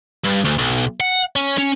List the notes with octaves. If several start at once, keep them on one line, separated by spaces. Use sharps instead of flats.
G2
D2
B1
F#5
C#4
C#4